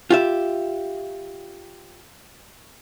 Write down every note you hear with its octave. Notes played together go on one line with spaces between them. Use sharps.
F4 G4 E5